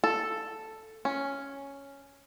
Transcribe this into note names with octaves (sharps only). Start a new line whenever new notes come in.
A4
C#4